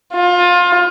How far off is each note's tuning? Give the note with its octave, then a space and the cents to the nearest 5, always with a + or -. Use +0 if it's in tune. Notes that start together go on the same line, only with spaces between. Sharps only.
F4 +25